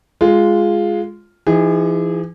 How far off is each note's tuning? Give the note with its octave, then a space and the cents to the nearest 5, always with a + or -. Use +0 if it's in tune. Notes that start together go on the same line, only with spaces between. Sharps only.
G#3 +0 F4 +0
E3 +45 D#4 +35 G#4 -25